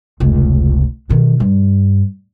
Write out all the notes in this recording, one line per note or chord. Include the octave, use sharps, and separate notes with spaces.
F1 C#2
B2 D#3
G2